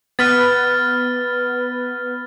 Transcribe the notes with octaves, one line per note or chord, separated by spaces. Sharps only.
B3 B4 F6 A6